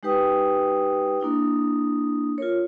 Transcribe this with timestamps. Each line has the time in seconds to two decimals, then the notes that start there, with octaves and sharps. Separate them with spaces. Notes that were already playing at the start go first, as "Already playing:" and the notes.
0.03 G#3 D#4 G4 B4 G5 D#6
1.20 A#3 D4 E4 D#6
2.38 F4 A#4 C#5